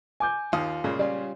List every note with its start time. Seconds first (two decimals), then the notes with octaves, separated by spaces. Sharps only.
0.20 G#5 D6 G6
0.53 D#2 F4 F5 D#6
0.84 A#2 C#3 G#3
0.99 G3 C#4 F4 D5